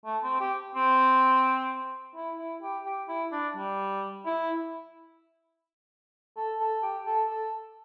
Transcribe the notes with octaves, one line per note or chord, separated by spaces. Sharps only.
A3
C4
G4
C4
E4
E4
G4
G4
E4
D4
G3
E4
A4
A4
G4
A4
A4